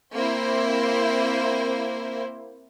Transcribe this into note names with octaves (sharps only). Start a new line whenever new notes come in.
A#3 C4 E4 C5